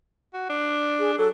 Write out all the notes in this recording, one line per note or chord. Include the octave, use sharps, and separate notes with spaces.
F#4
D4
G#4
F#3 A4